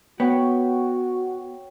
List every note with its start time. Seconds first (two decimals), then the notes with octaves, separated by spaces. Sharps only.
0.20 B3 F#4 C#5 G5